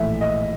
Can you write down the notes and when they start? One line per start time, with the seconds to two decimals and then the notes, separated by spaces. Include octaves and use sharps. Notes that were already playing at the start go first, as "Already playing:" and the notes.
Already playing: A#1 A2 E3 E5
0.21 D#5